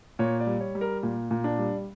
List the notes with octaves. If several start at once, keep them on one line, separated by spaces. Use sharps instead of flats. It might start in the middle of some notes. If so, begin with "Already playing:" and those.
A#2 C#5
D5
G3
C#5
G3
A#4
A#2
A#2
D4
G3